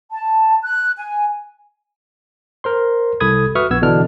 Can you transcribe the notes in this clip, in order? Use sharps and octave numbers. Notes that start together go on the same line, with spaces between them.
A5
F#6
G#5
A#4 C5 C6
C2 A4 B5 D#6 G#6
F#4 B4 E5 C#6 D#6 F6
A#1 B3 E6 G#6
B2 D3 E3 D4 F6